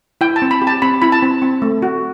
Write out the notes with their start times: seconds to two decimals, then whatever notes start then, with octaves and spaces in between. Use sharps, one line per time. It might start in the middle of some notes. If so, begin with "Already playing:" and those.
0.21 E4 G5
0.36 A5
0.42 C4
0.51 B5
0.62 G4
0.67 A5
0.82 C4 B5
1.02 E4 B5
1.12 A5
1.22 C4
1.42 C4
1.62 A3
1.82 F#4